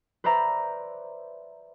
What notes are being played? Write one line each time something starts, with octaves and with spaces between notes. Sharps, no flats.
B4 C5 D5 E5 A#5